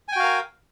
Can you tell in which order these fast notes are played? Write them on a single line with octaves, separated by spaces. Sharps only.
G#5 G5 F#4 F5 A#4